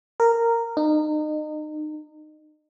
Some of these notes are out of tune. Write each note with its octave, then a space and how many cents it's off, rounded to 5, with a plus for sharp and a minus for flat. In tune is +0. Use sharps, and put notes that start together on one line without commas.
A#4 -10
D#4 -30